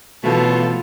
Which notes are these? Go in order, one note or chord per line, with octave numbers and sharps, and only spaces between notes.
B2 E3 F3 A3 F4 A4